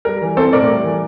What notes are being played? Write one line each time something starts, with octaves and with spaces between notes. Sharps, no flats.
G3 A#4
E3
C4 A4 C5
A2 A#4 D5
G3
E3